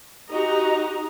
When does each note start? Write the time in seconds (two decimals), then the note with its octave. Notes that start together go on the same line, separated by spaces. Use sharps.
0.31 D#4 F#4 G4 D#5 A#5